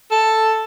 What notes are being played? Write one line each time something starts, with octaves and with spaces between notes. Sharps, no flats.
A4